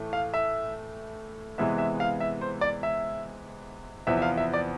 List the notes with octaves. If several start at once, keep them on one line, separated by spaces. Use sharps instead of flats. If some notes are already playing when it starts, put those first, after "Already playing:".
Already playing: A2 E3 A3
F5
E5
C3 E3 G#3 B3 E5
E5
F5
E5
C5
D5
E5
E2 C3 F3 B3 E5
E5
F5
E5
D5